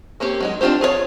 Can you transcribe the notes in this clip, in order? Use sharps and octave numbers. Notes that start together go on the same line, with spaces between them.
A#3 C4 C#4 G4
F#3 G#3 D#4
C4 D4 F4 G4 C5
F4 G#4 A#4 C#5